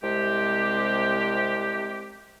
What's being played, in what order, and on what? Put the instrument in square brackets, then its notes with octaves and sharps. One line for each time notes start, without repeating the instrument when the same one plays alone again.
[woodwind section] C2 C3 G#3 G4